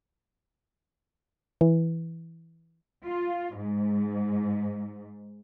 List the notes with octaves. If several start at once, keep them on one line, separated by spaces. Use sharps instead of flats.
E3
F4
G#2